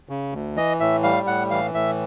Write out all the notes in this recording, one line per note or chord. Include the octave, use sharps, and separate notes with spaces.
C#3
D2
E3 D#5
A2 E5
G3 F5
A2 F#5
E3 F5
A2 E5